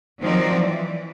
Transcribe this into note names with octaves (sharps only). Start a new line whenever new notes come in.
D#3 F3 F#3 C4 D5
E3